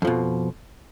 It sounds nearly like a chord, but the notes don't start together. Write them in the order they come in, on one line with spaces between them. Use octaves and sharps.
F2 F3 B2